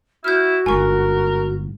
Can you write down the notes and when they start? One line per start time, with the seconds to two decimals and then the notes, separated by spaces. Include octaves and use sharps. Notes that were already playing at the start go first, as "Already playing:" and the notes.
0.24 E4 F#4 F6 G6
0.66 G1 G#2 A#4 G#5 C#6